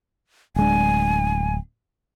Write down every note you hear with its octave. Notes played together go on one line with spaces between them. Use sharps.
D1 G#3 D4 G#5